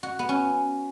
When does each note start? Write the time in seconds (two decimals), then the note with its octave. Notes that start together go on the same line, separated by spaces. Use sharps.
0.03 F#4
0.19 B3
0.29 C#4